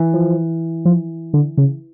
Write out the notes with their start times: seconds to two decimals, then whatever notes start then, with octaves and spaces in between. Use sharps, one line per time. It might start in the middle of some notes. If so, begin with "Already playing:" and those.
Already playing: E3
0.14 F3
0.85 F3
1.34 D3
1.57 C#3